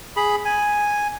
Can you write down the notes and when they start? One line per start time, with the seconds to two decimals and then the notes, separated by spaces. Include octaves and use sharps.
0.16 G#4 B5
0.45 G#5